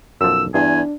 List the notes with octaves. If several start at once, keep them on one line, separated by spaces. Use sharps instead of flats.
B1 F#2 F3 E6
E2 G2 D4 G#5